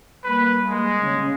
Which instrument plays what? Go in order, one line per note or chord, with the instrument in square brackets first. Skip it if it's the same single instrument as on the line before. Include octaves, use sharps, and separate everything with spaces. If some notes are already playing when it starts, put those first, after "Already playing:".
[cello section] G3 A#3 [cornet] B4
[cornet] G#3
[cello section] C#3